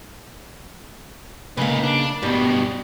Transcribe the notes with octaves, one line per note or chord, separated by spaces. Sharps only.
C#3 A#3 D#4 B4
D4
G2 B2 G3